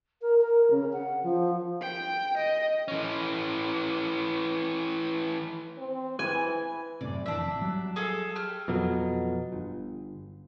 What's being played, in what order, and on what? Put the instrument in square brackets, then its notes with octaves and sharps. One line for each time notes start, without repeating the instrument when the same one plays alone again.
[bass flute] A#4
A#4
C#3
F#5
F3
[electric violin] G5
D#5
[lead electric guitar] E3 C#4
[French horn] C4
[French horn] E3 [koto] G#5
[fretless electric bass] F#2 A2 C3 [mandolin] D5
[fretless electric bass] F2 E3 [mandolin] D4 E5
[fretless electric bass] G#1
F#3 G3
[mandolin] G#4 A4 F5
G4 F6
[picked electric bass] F2 B2 F#3
G1